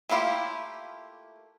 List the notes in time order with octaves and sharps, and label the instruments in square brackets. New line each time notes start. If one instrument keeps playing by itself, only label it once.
[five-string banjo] A3 A#3 E4 F4 G4